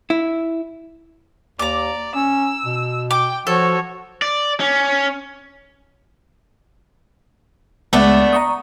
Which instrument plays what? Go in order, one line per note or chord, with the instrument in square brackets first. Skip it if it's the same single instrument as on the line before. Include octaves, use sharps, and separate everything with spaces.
[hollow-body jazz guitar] E4
[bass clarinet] D#2 [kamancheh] D5 [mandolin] A#5 D6
[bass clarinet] C#4 [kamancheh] E6
[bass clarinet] B2
[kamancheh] G5 [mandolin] D6
[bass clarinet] F3 [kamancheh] F#4 C#5 [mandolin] A4
[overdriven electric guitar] D5
C#4
[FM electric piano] C#2 G#3 [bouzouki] A3 B3 D4
[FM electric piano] A#5 C#6 D#6